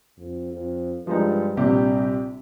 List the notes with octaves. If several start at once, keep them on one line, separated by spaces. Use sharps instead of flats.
F2
F2
G2 F3 G#3 D#4
A#1 C3 G3 G4